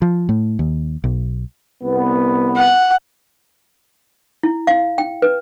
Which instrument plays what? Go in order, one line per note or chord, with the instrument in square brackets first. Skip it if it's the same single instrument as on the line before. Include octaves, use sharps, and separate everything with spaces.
[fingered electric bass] F3
A2
D#2
B1
[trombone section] C2 B3
[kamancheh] F#5
[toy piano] E4
F5
G5
B4